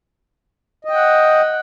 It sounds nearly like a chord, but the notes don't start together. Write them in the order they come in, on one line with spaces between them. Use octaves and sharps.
D#5 G5 F#5